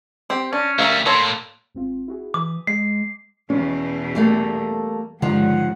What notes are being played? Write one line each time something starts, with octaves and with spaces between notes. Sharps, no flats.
C4 G4
C#4 D4
D2 G3 A#4 E5 F5
A2 A#3 A4 C#5 C6
G#1 C4 F4
E4 F#4 G#4
E3 D6 D#6
G#3 C7
E2 B2 C#4
G3 A3 A#3 A4
C#2 G2 D3 D#3 F3 F#5